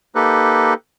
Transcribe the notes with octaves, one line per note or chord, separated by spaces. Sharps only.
A#3 D#4 G4 A4 B4